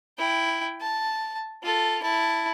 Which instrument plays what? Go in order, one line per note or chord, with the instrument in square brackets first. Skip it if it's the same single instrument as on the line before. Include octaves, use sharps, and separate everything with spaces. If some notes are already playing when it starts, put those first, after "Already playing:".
[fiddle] E4 G5
A5
F4 A4
E4 A5